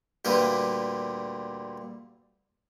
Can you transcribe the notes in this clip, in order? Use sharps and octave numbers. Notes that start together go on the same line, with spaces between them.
D2 A#2 G3 B4